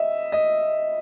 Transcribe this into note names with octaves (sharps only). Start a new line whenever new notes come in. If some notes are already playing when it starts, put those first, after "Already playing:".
Already playing: D#5 E5
D#5